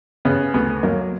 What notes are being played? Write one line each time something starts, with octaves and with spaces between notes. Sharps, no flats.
C#3 B3
D2 B3
F#3 A#3